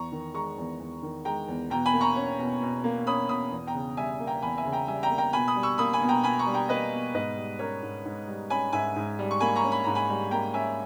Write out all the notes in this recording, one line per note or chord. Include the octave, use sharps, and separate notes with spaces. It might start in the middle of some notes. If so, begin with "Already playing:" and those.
Already playing: E2 A#5 C#6
D#3
G#3 A#5 C#6
E2
E2
D#3
G#3 G5 A#5
E2
B2 G5 A#5
G#5 B5
A#3
A#5 C#6
C#4
B2
B2
A#3
C#4 B5 D#6
B2 B5 D#6
E2
G5 A#5
C#3
G3 E5 G#5
A#3
G5 A#5
E2 G#5 B5
E5 G#5
C#3
G5 A#5
G3 E5 G#5
G5 A#5
A#3
G5 A#5
B2 G#5 B5
B5 D#6
G3
C#6 E6
A#3 B5 D#6
G#5 B5
B2
G5 A#5
B2 G#5 B5
A#5 C#6
G3
G5 A#5
A#3 B4 D#5
B2
G#2 B4 D#5
G3
C#4 A#4 C#5
G#2
G#2
G3
C#4 G#5 B5
G#2 E5 G#5
G#2
G3
C#6
A#3 G#5 B5
A#5 C#6
C#4
B5
G#2 A#5
G#5 B5
G3
A#3 G5 A#5
C#4 E5 G#5